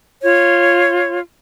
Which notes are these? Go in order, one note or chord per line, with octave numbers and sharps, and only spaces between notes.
F4 C#5